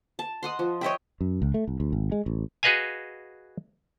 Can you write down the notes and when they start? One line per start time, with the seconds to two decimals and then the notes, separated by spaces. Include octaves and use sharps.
0.19 A5
0.43 D#5 F#5 C6
0.59 F3
0.81 C#5 D#5 E5 G5
1.21 F#2
1.42 C#2
1.54 A3
1.68 C2
1.80 D2
1.93 G#1
2.12 G#3
2.26 A1
2.63 F#4 G#4 B4 D#5 F5 G#5